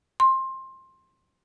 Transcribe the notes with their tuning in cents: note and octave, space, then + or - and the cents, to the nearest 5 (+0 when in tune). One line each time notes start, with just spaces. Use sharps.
C6 +20